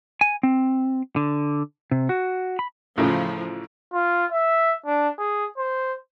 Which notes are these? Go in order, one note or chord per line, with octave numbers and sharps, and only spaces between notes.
G#5
C4
D3
C3
F#4
B5
A1 A2 C#3 F3
F4
E5
D4
G#4
C5